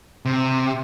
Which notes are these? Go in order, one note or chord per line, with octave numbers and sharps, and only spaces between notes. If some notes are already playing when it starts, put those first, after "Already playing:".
C3